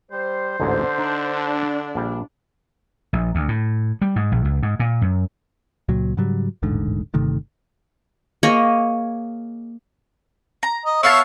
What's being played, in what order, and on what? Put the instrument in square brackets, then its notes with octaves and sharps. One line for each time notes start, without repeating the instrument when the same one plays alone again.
[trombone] G3 [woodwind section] C5
[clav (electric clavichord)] A1 D2 G#2 [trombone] D3
[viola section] D4 [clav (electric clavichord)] D#4
[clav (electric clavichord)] A#1 G3
[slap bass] A#1
D2
A2
G3
G#2
A#1
C#2
G#2
A#2
F#2
[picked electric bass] C#2 A#2 F#3
G#2 C#3 F#3 G3
D#1 A1 G#2 D3
G1 C3 D#3 A3
[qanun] A#3 G#4 C#5 D#5
[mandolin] A#5
[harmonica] D#5
[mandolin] B3 F5 A5 [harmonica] C#5 E5